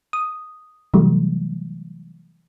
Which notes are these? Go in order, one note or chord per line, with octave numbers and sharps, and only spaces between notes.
D#6
C3 E3 F#3 G3 A3